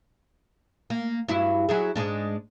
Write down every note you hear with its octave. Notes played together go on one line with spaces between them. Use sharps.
A#3
G2 F#3 E4
F#3 E4 G#4
G#2 G#3 D4